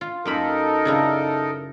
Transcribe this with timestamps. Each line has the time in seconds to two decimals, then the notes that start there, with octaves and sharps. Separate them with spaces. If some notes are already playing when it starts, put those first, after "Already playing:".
0.01 F4
0.25 F#2 A#3 D#4 A4 A#4 B5
0.85 C#3 D4 E4